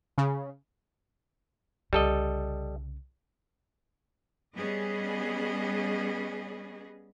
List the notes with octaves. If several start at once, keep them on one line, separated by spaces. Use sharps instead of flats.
C#3
C2 C#3 G3 A4 D#5
G3 B3 C#4 G#4 D#5